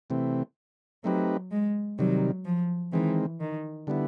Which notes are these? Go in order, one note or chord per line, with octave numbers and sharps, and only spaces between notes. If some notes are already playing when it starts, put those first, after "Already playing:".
C3 E3 A3 C4
F#3 A3 C4 D#4 G4 B4
G#3
C3 D#3 F#3 G3
F3
D#3 E3 G#3 C4
D#3
D3 G3 B3 E4